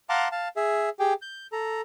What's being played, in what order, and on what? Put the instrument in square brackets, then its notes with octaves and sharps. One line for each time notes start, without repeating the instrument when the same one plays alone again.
[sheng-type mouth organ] F5 F#5 A5 A#5 C6 D6
F5 A5
G#4 E5
G4 G#4 G5
G6
A4 A#5